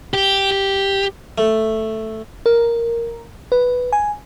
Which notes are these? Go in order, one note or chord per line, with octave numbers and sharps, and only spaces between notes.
G4
G4
A3
A#4
B4
G#5